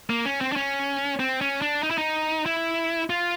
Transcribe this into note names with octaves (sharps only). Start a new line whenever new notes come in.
A#3
C#4
C4
D4
C#4
C4
C#4
D4
D#4
E4
D#4
E4
F4